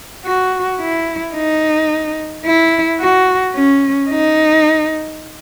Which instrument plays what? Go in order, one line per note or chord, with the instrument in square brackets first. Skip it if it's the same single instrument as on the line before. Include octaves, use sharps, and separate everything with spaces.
[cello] F#4
E4
D#4
E4
F#4
C#4
D#4